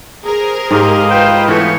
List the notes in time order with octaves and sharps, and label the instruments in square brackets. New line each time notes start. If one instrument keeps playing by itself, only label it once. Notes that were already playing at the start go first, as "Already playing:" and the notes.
[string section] G#4 A#4 C5
[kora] G#2 [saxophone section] A#3 D#5 F5 [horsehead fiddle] G4
[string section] F4 B4 [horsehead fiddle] C5 G5
[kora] E3 [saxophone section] A3 B3 A4 [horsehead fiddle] C#5